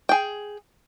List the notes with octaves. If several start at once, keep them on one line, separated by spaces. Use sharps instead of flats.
G#4 G5